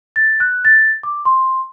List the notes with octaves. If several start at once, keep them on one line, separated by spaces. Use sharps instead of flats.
A6
F#6
A6
D6
C6